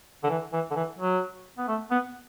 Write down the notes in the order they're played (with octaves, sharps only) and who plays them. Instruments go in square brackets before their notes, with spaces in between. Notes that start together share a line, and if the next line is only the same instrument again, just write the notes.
[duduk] D3
E3
E3
D3
E3
F#3
B3
A3
B3